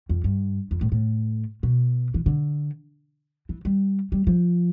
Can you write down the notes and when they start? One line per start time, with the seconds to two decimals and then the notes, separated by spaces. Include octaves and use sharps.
0.09 F2
0.24 G2
0.71 F2
0.81 A2
0.92 A2
1.63 B2
2.14 E3
2.26 D3
3.49 E3
3.65 G3
4.12 G3
4.27 F3